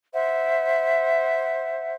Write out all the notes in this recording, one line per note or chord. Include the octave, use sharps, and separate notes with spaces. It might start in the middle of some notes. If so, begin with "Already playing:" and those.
C5 E5 F#5